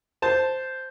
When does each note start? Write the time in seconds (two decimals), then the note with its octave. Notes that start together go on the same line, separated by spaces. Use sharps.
0.22 C5 A5